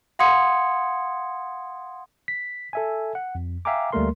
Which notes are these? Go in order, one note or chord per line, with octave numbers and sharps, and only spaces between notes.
F5 F#5 C6 D#6 G#6 C#7
B6
A4 E5 G#5
F#5
F2
E5 F5 G5 G#5 A#5 D6
D2 G3 A3 A#3 A#4 C6